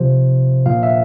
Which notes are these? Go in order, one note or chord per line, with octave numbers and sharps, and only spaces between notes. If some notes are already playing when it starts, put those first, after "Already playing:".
Already playing: C3 F3 C5
A#2 F3 F5
E5